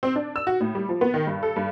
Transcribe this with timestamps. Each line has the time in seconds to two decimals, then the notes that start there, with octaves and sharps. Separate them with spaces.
0.03 C4
0.16 D4
0.36 E6
0.47 F#4
0.61 A2
0.75 G3
0.89 F3
1.01 B3
1.14 D#3
1.27 G2
1.43 A4
1.56 G2